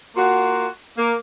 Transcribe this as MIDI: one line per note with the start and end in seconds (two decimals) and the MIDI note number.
0.16 0.66 58
0.16 0.66 65
0.16 0.66 66
0.97 1.14 58